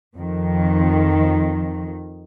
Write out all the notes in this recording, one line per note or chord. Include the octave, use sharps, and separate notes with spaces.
F2 D#3